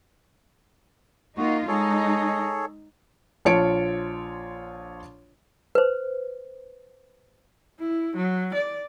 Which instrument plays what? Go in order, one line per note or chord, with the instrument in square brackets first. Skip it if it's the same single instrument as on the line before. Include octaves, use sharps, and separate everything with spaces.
[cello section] A#3 D#4 F4 [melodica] F#4
[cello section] G#3 D#4 [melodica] G#4 A4 C#5
[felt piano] A#1 F4 C#5 A5 C#7 D7
[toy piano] B4 C5
[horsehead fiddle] E4
F#3
D5